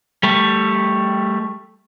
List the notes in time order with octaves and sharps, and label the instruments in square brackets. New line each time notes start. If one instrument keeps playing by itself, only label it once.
[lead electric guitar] G3 A3